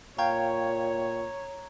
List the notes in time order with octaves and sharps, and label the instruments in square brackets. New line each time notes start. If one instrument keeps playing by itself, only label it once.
[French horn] A#2 [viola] C#5 [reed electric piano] F5 G5 [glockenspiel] A#5 C#6 G#6